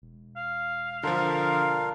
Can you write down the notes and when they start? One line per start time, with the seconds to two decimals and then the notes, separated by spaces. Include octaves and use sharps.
0.02 E1
0.36 F5
1.03 D3 F3 D4 F4 A#4